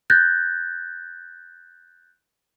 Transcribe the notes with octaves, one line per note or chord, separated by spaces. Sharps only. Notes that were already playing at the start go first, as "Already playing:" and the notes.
F#6 G6 A6 A#6